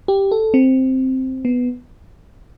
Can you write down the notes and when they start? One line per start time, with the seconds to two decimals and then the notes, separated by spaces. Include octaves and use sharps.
0.08 G4
0.31 A4
0.54 C4
1.45 B3